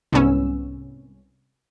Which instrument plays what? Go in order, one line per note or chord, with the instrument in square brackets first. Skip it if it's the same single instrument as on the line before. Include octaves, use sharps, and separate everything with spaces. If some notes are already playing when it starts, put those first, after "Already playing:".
[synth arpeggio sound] C2 G#2 B3 C#4 E6